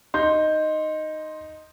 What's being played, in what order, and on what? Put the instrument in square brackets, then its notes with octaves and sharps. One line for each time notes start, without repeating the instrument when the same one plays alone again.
[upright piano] D#4 [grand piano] C6 G6